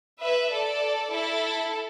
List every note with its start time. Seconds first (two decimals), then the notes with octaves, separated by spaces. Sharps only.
0.21 B4 E5
0.51 A4 D5
1.12 E4 A4